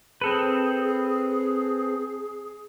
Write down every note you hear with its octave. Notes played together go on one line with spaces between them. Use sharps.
C4 G#4 A4 B4